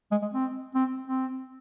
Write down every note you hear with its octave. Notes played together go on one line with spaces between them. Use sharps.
G#3
G#3
C4
C4
C4